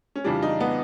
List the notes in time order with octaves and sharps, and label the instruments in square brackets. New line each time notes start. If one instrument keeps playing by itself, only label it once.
[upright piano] C#4
F2 C#3 E3 G3 D4
D#4
B3